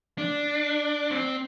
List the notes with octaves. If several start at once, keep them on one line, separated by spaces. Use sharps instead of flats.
D4
C4